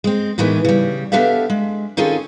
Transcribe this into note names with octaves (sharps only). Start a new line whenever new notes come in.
G#3 C4
A2 D#3 E3 G#3 B3
C#3 G3
B3 D4 G4 A4 E5 F5
G#3
D#3 C4 C#4 F4 G#4 A4